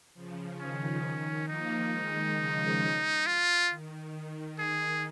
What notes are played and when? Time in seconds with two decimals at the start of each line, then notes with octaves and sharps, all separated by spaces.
0.14 C#3 F3
0.59 D#3 C#4
1.04 D#3
1.48 F3 A#3 D#4
1.92 D#3 G#3
2.37 C#3 F3
3.26 F4
3.70 D#3
4.15 D#3
4.59 D#3 G#4